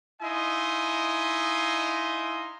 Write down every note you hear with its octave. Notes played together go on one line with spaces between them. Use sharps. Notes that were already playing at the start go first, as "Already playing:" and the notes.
D#4 E4 D#5 F5 G#5 C6